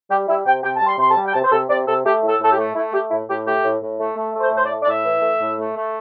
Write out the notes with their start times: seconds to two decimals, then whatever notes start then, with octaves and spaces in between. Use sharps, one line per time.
0.10 G3 G4
0.27 G3 E4
0.45 C3 G5
0.62 C3 G5
0.76 G3 A5
0.86 C6
0.97 C3 C6
1.10 A5
1.16 G3
1.26 G5
1.33 C3 A5
1.43 C5
1.50 C3 A4
1.69 C3 D5
1.87 C3 A4
2.04 A3 G4
2.22 A2
2.27 A4
2.40 A2 A4
2.51 G4
2.57 A3
2.75 A3 E4
2.93 A3 G4
3.10 A2 E4
3.28 A2 G4
3.45 A3 G4
3.63 A2
3.81 A2
3.99 A3
4.17 A3
4.35 A3
4.40 C5
4.52 A2 C5
4.64 D5
4.70 A3
4.81 D5
4.86 A2 E5
5.05 E3
5.22 A3
5.40 A2
5.58 A3
5.75 A3